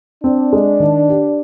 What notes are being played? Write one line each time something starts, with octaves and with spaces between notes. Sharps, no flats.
C4 D4
G#3
D#3
G4